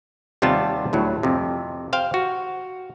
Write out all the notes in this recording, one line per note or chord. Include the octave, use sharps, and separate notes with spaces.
D#2 C3 G3 B3 F4 A5
D2 A2 F#3
F2 C3
C5 F5 G5
F#4